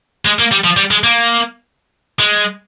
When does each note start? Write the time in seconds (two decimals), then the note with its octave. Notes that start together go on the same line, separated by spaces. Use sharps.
0.25 G#3
0.39 A#3
0.51 G3
0.64 F3
0.77 G3
0.91 G#3
1.03 A#3
2.20 G#3